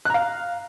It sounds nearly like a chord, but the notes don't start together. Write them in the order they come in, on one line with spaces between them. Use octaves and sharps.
F#6 A#5 F5